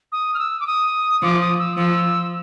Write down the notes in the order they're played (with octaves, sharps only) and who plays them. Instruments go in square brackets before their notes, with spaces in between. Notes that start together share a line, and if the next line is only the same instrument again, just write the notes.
[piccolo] D#6
F6
E6
D6
D#6
[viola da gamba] F3 [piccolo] D6
[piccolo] D#6
E6
[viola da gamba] F3 [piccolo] E6